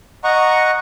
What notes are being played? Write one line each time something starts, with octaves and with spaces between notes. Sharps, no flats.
D#5 F#5 A#5 C#6